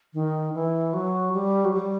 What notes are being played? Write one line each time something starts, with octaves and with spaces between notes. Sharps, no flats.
D#3
E3
F#3
G3
F#3
G3